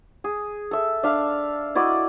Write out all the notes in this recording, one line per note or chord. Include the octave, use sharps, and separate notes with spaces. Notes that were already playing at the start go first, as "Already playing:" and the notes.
G#4
A4 E5
D4 E5 F5
E4 F#4 D5 D#5